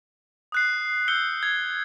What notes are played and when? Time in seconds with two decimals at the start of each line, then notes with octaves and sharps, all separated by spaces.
0.52 D#6 F#6 C7
1.08 E6 G6 C7 C#7 G7
1.43 G#6